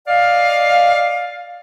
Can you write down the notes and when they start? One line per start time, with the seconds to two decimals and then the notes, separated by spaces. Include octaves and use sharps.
0.08 D5 D#5 F5